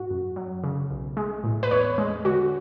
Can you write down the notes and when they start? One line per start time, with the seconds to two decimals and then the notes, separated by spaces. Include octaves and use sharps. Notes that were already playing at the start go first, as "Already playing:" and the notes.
Already playing: G#2 F#4
0.11 F#2
0.36 F#3
0.64 C#3
0.91 B1
1.17 G#3
1.44 A2
1.63 B4
1.71 E2 C#5
1.98 G#3
2.25 D3 F#4